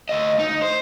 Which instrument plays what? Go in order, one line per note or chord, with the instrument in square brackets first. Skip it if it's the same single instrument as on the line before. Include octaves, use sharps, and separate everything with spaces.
[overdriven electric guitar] D2 D#5
D#4
C5